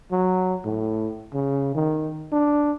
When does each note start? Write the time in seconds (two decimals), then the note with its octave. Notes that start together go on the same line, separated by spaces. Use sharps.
0.12 F#3
0.65 A2
1.34 C#3
1.75 D#3
2.32 D4